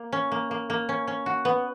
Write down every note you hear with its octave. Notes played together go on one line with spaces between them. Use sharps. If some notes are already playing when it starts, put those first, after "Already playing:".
Already playing: A#3
C#4
A#3
A#3
A#3
C#4
C#4
F#4
B3